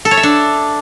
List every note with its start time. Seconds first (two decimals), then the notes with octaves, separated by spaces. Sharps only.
0.05 A4
0.11 C#5
0.17 E5
0.23 D4